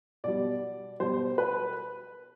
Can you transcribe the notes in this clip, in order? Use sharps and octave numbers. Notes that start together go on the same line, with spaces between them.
B2 G3 D5
B2 G3 C5
B4